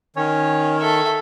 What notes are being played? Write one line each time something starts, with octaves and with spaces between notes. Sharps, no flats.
D#3 C#4 C#5
A4 E5 C#6